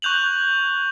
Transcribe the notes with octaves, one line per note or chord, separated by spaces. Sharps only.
C#6 F#6 G6 F7 F#7